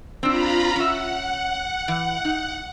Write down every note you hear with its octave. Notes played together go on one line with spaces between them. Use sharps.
C4 D4 F4 A#5 B5
C#4 E5 F#5
E3
D#4